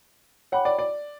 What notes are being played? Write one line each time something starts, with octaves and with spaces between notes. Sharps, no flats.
C#5 F#5 G5 B5 D6
D5
D5